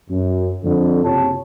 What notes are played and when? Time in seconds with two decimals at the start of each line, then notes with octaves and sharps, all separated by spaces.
0.10 F#2
0.63 F2 D3
1.04 F#1 C3 F4 G4 C#5 A5